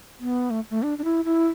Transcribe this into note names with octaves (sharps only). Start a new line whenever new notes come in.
B3
A3
A3
D4
D4
E4
E4